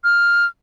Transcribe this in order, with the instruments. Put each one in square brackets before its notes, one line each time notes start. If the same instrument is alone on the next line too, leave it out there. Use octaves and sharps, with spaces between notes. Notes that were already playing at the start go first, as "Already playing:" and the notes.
[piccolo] F6